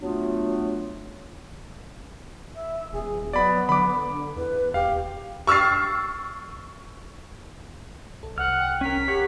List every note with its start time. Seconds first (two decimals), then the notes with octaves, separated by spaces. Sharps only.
0.01 F#3 A3 B3 D4 F4
2.55 E5
2.92 D#1 G#4
3.33 F#3 B3 D5 B5
3.69 D3 B5 D6
4.36 E2 B4
4.74 D#1 G4 F5
5.47 C#6 E6 F6 A6 C7
8.23 B1 A4
8.38 C2 F#5 F6
8.56 G5
8.81 C#4 A#4 B6
9.08 G4 C#5 F#5